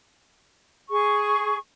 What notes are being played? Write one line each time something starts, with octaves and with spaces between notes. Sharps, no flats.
G#4 C#6